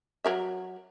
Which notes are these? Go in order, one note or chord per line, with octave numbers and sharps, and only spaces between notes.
F#3 A#4 E5